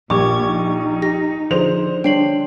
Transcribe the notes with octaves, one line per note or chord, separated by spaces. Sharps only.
A#1 A#2 G4 C#6 D6 G#6
D#4
G4 A#6
D3 F3 G#4 C5 F7
G3 D4 C#5 G5 C7 F#7